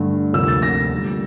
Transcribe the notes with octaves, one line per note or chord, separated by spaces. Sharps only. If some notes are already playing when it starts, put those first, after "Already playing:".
Already playing: G2 D3 A3
D2 C3 F3 A#3 E6
A6
A#6
D2 D3 G3 A#3